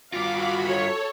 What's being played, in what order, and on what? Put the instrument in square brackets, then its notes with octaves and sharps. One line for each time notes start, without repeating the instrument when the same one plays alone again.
[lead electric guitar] G2 F4 [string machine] F#4 B5 [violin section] F5 D6
[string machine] A4 [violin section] C#5